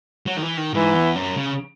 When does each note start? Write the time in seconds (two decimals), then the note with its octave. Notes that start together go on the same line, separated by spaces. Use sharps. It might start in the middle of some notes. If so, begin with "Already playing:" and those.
0.26 F#3
0.37 D#3
0.42 E3
0.57 D#3
0.73 G#2 E3
0.94 E2
1.15 F#2
1.36 C#3